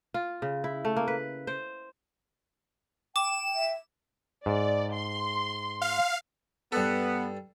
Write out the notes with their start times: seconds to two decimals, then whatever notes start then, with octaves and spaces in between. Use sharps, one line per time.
0.14 F4
0.42 C#3
0.64 E4
0.85 A3
0.96 A#3
1.08 B4
1.47 C5
3.16 G5 D6 E7
3.55 E5
4.46 G#2 D5
4.94 C6
5.81 F5
6.72 G2 B3 A4